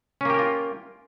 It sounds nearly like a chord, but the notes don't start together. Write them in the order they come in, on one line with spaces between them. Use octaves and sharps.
C#4 A#3 G4 A#4 F4